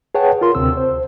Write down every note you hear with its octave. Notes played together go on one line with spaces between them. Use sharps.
G#4 B4 C#5 F#5 G5 A5
F4 A#4 C6
D2 C3 C4 E6
C5